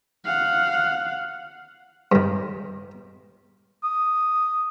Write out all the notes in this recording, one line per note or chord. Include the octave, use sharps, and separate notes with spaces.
F5 F#5
G2 D#3
D#6